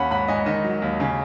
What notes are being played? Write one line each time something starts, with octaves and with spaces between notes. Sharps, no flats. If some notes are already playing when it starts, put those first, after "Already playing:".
Already playing: D#2 C#4 F#5 B5
G#2 F#5 B5
G#2 D#5 G#5
D#3 D#5
F#3
D#2
C#3